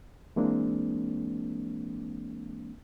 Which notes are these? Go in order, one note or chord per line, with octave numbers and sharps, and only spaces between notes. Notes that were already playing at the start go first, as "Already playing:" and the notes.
E3 G#3 A#3 C4 D4